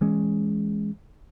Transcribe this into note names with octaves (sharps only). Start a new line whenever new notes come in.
E3 G#3 C#4